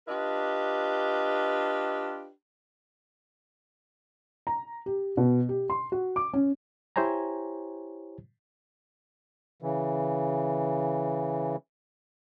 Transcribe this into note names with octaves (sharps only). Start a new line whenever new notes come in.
D4 F4 G4 B4 D#5
A#5
G4
B2
G4
C6
F#4
D6
C#4
E4 G4 C5 C#5 G#5 A#5
C#3 E3